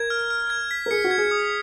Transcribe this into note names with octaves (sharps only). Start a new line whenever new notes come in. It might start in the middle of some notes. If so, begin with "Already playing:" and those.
Already playing: A#4 G#6
F6
F6
G#6
B6
A#4
G#4 C#7
F#4
G#6
G#4
D#6